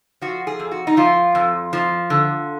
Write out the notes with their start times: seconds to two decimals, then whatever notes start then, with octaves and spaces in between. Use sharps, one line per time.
0.22 F3 F#4
0.47 G#4
0.60 F2
0.71 F#4
0.87 D#4
0.97 F3 F4
1.35 F2
1.73 F3
2.10 D3